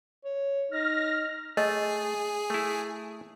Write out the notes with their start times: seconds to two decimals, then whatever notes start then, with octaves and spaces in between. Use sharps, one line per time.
0.25 C#5
0.71 D#4 F6 A#6
1.57 A3 G#4 D#5
2.50 A3 E4